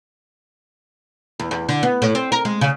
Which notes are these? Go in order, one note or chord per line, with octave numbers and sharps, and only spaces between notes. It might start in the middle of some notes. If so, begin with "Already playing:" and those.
E2
E2
D3
B3
A2
C4
A#4
G#3
C#3